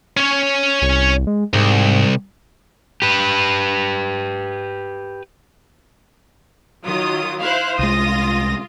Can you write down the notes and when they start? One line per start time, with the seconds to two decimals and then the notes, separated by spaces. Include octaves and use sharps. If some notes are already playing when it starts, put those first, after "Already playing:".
0.17 C#4 C#5
0.82 C2
1.27 G#3
1.53 C2 G#2
3.02 G4 B4
6.86 D#3 F#3 F4 D#6
7.40 E4 C5 F5 C6 F#6
7.79 C2 G#3 F4 D#6 A#6